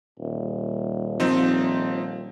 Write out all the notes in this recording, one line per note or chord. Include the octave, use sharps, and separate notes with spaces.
D#1
F3 C4 D#4